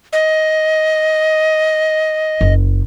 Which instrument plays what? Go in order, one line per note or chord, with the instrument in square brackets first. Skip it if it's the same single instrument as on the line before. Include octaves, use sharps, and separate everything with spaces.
[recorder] D#5
[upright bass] F#1